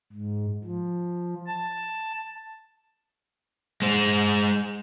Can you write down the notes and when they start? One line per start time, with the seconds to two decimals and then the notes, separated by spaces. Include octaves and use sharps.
0.12 G#2
0.64 F3
1.47 A5
3.82 G#3 C5